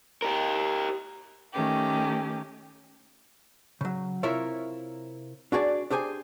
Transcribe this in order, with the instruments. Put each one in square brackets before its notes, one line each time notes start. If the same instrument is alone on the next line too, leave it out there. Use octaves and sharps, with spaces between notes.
[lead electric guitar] G4 A#4
[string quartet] D#3 A3 C#4 G4
[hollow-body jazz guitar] C#3 F#3
C3 E4 F4 A#4 C#5 E5
D4 F#4 G#4 C#5 D5
D4 G4 G#4 C5 G#5